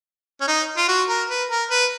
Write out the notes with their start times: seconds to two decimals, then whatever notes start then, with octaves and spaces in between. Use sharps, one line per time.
0.41 C#4
0.48 D#4
0.78 F4
0.88 F#4
1.09 A#4
1.29 B4
1.50 A#4
1.70 B4